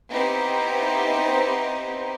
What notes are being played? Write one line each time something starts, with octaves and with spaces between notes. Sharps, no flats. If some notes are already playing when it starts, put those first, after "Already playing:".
B3 C4 D#4 E4 G4 C5